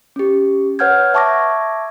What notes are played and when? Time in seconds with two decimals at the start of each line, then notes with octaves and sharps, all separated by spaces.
0.16 C#4 G4
0.79 B4 C#5 F#5 F6 G6 G#6
1.14 E5 A5 C#6 D6 G#6 A#6